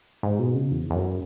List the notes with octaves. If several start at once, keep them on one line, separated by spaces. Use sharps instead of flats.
G#2
B2
C#3
E2
E2
F#2